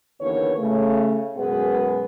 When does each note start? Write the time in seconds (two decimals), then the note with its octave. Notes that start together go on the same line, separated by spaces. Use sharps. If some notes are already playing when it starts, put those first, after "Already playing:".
0.21 D#2 D3 E3 A#3 B3 C#5
0.59 C#3 A3
1.38 F#2 B2 G#3 B3 G#4 B4